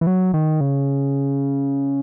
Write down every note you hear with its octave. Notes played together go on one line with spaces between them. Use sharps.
E3
F#3
D#3
C#3